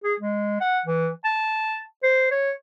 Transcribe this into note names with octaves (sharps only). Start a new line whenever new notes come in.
G#4
G#3
F#5
E3
A5
C5
C#5